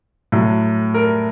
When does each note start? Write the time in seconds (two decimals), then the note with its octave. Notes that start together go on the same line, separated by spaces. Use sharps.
0.32 A2 F#3
0.94 A#4